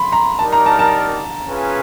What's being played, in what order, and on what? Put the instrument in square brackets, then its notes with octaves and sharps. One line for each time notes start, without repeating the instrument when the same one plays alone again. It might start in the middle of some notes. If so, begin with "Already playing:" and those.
Already playing: [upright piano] B5 C6
A#5
[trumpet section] D#4 G4 A#4 D5 [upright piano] A5
[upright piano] A#5
A5
A5
[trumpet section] C#4 F4 G#4 B4